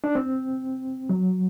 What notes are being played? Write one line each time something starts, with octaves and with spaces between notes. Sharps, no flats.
D4
C4
F#3